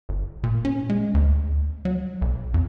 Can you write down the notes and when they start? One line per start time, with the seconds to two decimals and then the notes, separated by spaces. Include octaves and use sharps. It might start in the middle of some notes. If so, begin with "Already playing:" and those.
0.09 G1
0.44 A#2
0.65 C#4
0.90 G#3
1.14 D2
1.85 F#3
2.21 B1
2.54 F2